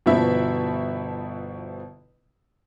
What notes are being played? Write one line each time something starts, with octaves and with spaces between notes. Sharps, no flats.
G1 B2 F3 E4 E5